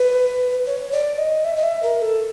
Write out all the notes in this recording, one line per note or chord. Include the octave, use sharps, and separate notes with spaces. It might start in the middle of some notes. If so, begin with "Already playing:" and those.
Already playing: B4
C#5
D5
D#5
E5
D#5
E5
A#4
A4